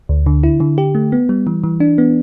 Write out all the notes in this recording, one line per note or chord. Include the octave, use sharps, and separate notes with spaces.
D2
D3
E4
D3
G4
A3
B3
G3
E3
E3
D4
B3